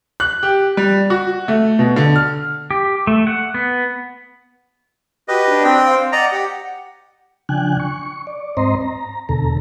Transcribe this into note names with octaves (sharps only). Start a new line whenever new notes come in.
F#6
G4
G3
F#4
A3
B2
D3
F6
G4
A3
F#5
B3
F#4 G4 B4 D#5
D4
C4 G5
C5 F5
D5 D#5 F#5 A#5
G4
C#3 F3 D4 G5 G#5 F#6
C#6
D5
G#2 C4 C5 D#5 A#5 C6
A#5
E2 B2 D3 A4 A#5